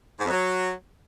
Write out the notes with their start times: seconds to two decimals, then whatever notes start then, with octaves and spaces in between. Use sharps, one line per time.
0.20 G#2
0.25 F2
0.30 F#3